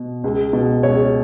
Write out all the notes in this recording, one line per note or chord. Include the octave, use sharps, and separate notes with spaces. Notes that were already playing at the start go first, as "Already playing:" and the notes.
Already playing: B2
C#2
B2
C#2 C#5